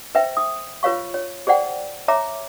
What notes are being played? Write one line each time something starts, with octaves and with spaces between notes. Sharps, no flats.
B4 C5 E5 G5
D#6
F4 B4 C#5 F5 C#6
C#5
G#4 C5 D5 F#5 G5
C#5 E5 A#5 D6